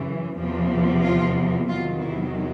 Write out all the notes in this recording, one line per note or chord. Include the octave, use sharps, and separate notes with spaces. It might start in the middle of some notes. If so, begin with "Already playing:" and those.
Already playing: F#2 C#3 E3
E2 C3 F3
F4
E2 C3 D#3 F#3 F4
E4